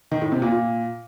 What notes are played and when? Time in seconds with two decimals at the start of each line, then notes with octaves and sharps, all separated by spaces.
0.11 D#3
0.22 A2
0.32 C3
0.42 A#2
0.52 A#2